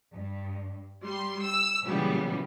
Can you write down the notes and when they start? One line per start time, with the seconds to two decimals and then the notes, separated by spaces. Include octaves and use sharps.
0.14 G2
1.03 G3 C6
1.43 E6
1.85 A#2 C#3 E3 F#3 G3 B3